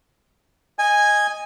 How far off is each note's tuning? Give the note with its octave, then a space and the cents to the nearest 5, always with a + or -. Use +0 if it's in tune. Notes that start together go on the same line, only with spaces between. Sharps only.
D#5 +0 G#5 -10